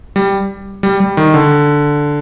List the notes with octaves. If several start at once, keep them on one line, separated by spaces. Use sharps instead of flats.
G3
G3
G3
D#3
D3